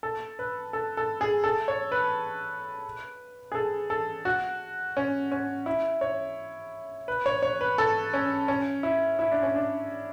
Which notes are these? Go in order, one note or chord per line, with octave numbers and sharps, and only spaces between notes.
A4
B4
A4
A4
G#4
A4
C#5
B4
G#4
A4
A4
F#4
C#4
C#4
E4
C#5
B4
C#5
C#5
B4
A4
C#4
C#4
E4
E4
D4
C#4
D4